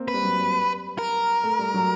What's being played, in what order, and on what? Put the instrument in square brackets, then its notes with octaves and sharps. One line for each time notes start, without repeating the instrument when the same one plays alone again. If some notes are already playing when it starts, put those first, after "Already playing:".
Already playing: [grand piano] A#3 C4
[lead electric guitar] B4
[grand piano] G3
F#3
G3
[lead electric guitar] A#4
[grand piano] A3
G3
F#3